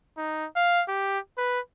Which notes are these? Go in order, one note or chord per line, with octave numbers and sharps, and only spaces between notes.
D#4
F5
G4
B4